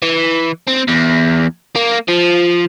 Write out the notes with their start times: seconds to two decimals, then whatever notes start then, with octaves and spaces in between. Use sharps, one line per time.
0.03 E3
0.67 C4
0.88 E2
1.76 A#3
2.09 F3